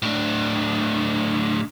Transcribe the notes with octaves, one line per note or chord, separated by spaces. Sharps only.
A2 D4